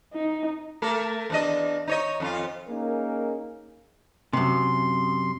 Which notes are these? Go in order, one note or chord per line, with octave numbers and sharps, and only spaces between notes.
D#4
A3 A4 A#4
E2 D4 D#5
D#4 C#5 D#5
F2 D4 F4
A#3 C#4 D#4 G#4 A#4
F#2 C3 C6